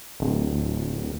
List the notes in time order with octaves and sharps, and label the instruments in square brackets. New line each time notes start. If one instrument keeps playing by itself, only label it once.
[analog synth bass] D1